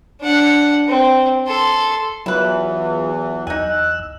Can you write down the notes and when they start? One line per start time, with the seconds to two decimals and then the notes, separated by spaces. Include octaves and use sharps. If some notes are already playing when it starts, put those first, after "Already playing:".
0.20 D4 F#5
0.88 C4
1.47 A4 C6
2.26 E2 E3 F#3 E4 F4 B4
3.47 E2 D#4 G#5 E6 F#6